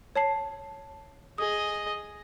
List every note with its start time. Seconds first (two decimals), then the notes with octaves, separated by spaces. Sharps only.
0.16 C#5 A5 C7
1.38 G#4 D#5 D#6